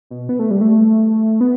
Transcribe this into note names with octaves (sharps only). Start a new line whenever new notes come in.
B2
B3
A3
G3
A3
B3